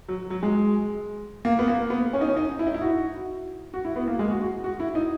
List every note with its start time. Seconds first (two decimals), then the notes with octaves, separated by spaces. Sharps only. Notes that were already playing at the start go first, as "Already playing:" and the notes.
0.08 F#3
0.30 F#3
0.43 G#3
1.45 A#3
1.59 B3
1.68 A#3
1.90 B3
2.13 C#4
2.21 D#4
2.28 C#4
2.37 D#4
2.59 E4
2.67 D#4
2.74 E4
2.81 F#4
3.74 F#4
3.85 E4
3.96 B3
4.08 A#3
4.19 G#3
4.31 F#4
4.42 F#4
4.64 F#4
4.80 E4
4.95 D#4